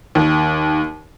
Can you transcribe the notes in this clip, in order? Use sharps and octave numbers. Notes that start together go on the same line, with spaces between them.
D#2